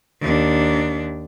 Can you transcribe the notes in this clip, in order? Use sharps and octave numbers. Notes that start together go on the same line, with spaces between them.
D#2 D4